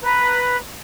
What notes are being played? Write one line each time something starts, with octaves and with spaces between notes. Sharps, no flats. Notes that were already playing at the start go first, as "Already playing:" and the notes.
B4 A#5